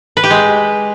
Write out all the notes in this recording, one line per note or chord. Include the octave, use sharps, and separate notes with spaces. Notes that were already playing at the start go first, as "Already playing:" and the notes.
B4
G4
G#3